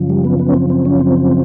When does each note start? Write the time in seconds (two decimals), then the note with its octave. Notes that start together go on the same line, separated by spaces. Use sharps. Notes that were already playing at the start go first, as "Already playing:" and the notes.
Already playing: F#2 C#3 F3
0.10 G3
0.24 B3
0.39 B3
0.49 C#4
0.54 C4
0.70 C4
0.85 C#4
1.00 C4